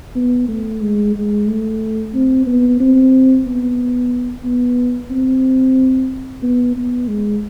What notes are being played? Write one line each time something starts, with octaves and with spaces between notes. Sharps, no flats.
B3
A3
G#3
G#3
A3
C4
B3
C4
B3
B3
C4
B3
B3
G#3